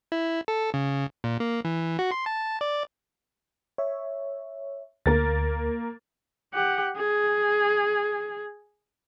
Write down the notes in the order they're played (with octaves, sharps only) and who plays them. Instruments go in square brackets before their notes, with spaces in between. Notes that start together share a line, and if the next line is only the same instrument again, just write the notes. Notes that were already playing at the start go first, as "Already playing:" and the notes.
[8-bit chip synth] E4
A4
C#3
A#2
A#3
E3
F#4
C6
A5
D5
[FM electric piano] C#5 E5
[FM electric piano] D2 [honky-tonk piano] A#3 A#4 A6
[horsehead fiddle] G4 F#5
G#4